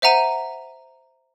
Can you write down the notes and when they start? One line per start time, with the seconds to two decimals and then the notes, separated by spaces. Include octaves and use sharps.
0.02 C5 E5 F#5 A#5 D#7